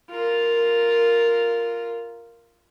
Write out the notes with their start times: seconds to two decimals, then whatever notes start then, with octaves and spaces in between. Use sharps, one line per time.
0.11 F4 A#4